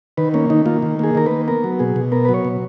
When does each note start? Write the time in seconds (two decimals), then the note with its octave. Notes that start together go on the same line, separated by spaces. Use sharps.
0.17 D#3 B4
0.34 A#3 C#4
0.50 D#3 D#4
0.66 A#3 F4
0.82 D#3
0.99 A#3 G#4
1.15 D#3 A#4
1.26 A#3 B4
1.48 B3 A#4
1.64 F#3
1.79 B2 G#4
1.96 B2
2.12 B3 A#4
2.25 B4
2.29 F#3
2.34 C#5
2.45 B2